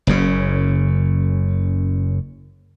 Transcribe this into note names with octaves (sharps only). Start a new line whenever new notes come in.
F#1 F#2 C#3